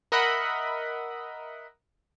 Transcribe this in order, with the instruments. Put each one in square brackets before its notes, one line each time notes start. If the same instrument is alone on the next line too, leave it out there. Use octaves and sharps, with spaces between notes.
[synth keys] A#4 D#5 E5 F#5 B5